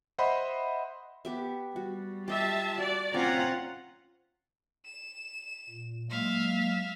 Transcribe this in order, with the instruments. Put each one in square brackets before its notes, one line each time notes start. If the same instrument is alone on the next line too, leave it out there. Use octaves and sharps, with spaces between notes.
[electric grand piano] C5 D#5 E5 F#5 B5 C6
[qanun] B3 G4 E5
[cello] G3 [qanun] F#4
[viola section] F4 E5 A5 [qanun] G4 D#5
[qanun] F#4 [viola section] D5
[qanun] C4 [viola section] C#4 A#5 [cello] F4 F#5
[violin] E7
[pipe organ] A#2
[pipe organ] F#3 G#3 A#3 [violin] E5 F5